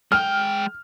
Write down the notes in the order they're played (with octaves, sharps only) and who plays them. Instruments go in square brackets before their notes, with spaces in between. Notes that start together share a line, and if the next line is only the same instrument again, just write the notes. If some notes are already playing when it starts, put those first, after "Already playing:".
[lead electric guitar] G#3 G5 [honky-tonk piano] F6